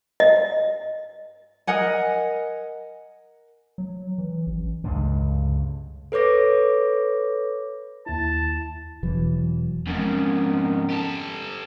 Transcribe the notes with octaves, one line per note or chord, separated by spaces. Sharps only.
D#5
A#4 D#5 F#5 G#5
F#3
E3
A1
C#2 G2 D3
A4 B4 C#5 D6 A#6
D#2 E4 A5
E1 E3 F#3
F2 G#2 D#3 B3 C#4
G4 A4